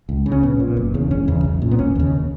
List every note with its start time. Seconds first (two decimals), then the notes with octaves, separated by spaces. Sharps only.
0.09 C#2
0.26 C#3
0.32 C#4
0.43 A#1 B3
0.60 A#2
0.77 F#1
0.94 E2 C#3
1.11 E1 C#4
1.28 E2 C#3
1.44 B1
1.62 A#2
1.71 B3
1.79 E1 C#4
1.95 D#2 C#3